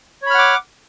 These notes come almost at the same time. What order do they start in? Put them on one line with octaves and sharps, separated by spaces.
C#5 B5 F6 F#5 D6